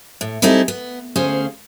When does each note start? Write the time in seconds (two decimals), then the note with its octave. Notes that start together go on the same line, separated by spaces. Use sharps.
0.21 A2
0.42 G3 C4 D#4 E4 G#4 A4
0.68 B3
1.16 D2 C#4 G#4 C5 F5